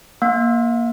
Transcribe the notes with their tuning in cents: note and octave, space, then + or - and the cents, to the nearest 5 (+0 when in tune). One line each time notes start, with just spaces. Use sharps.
A#3 +10 F5 +40